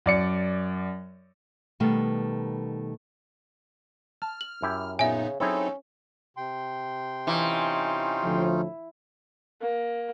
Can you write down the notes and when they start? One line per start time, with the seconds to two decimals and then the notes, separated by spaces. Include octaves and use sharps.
0.06 F#2 D5 C#7
1.80 B2 D#3 G3 A3 B3
4.22 A5 F6
4.41 F#7
4.62 F#2 E4 G4
4.99 A#2 C#3 B3 D#4 E5 G#5
5.40 F#3 C4 C#4 D#4 E4 G#4 A4
6.37 C3 G5 C6
7.27 E3 C#4 D#4 F4
8.23 D2 A2 F3
9.62 A#3